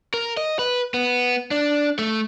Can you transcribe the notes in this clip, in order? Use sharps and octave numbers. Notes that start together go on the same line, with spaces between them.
A#4
D#5
B4
B3
D4
A3